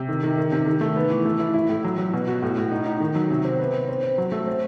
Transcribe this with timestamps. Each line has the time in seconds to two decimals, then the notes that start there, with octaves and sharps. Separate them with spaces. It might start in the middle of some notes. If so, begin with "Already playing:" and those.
Already playing: C3
0.08 D#3
0.23 D#3
0.38 D#3
0.52 C3
0.66 D#3
0.81 A3
0.96 B3
1.10 E3
1.25 A3
1.39 E4
1.54 E4
1.69 A2
1.84 F#3
1.98 F#3
2.13 B2
2.28 F#4
2.42 A2
2.58 A2
2.72 D#4
2.86 D#4
3.00 D#3
3.15 F#3
3.30 C3
3.45 C4
3.60 B3
3.74 B3
3.89 C4
4.03 C4
4.18 F#3
4.32 A3
4.47 C4